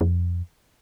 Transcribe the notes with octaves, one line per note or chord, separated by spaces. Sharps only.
F2